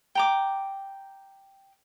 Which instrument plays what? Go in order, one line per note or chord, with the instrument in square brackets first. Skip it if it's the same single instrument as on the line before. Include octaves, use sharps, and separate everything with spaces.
[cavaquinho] G5 A#5 D6